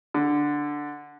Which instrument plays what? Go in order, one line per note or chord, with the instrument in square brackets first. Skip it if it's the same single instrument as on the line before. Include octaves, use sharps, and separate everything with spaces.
[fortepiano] D3